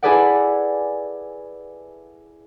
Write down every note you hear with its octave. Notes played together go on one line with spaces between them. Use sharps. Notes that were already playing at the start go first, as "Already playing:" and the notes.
E4 G#4 A4 B4 D5 F#5